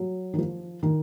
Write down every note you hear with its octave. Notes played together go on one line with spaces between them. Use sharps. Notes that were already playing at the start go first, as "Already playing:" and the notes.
Already playing: F#3
D#3
F3
D#3